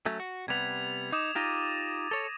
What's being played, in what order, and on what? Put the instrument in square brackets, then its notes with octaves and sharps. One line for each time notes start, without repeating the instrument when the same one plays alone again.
[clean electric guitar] F#3 A3 C#4
F#4
[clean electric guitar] C3 G3 B3 [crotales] G#6 F7
[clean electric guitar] D#4 [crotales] D6 D#6 E7
[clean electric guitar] D#4 F4 G4 [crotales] A6 A#6 D#7
[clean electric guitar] A4 C#5